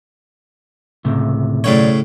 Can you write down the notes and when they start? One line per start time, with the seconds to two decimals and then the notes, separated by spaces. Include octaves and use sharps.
1.04 C#2 A2 C3
1.64 B1 A2 C#3 C#5 D5